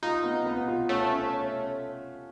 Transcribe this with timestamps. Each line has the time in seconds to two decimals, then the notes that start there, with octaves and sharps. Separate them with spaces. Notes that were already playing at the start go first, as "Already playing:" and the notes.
0.03 D#4 F4
0.24 B3
0.46 B3
0.68 F4
0.89 A3 C#4
1.12 C#4
1.33 C#4